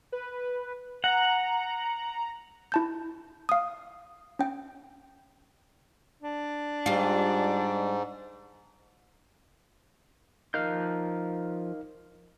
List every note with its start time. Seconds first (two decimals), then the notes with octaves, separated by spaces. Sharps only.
0.12 B4
1.04 F#5 A#5
2.72 E4 A5 G6
3.49 F5 D#6
4.39 C#4 G5
6.22 D4
6.86 G#2 G3 F4
10.54 F3 D#4 A#4 F5 F#6 G6